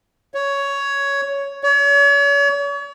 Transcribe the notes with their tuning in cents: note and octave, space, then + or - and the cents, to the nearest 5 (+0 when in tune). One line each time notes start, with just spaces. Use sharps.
C#5 +10
C#5 +40